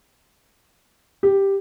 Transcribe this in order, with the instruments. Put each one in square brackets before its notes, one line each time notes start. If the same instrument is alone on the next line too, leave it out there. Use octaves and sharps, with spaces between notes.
[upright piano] G4